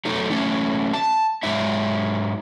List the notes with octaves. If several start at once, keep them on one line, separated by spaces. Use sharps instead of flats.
F#3 A3 D#4
F#3 A3 C#4
A5
G#2 F#3 D#4 E5